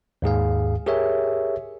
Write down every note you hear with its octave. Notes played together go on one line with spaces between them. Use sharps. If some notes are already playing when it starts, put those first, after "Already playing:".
D#2 G#2 G#4 F5
G4 G#4 A#4 C#5 E5